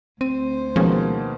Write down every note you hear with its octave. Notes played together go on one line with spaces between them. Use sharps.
D2 C4 C5 D#7
B2 D#3 F3 G#3 A#3 C#4